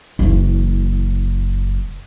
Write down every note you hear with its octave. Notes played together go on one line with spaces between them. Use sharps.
F#1 E3